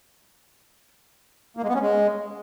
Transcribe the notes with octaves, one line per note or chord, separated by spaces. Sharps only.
A#3
G#3
B3
C#4
G#3